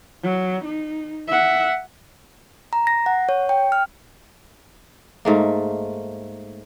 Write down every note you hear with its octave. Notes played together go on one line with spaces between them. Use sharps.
F#3
D#4
E5 F#5
A#5
A#6
F#5
C#5
G5
F6
G#2 A3 A#3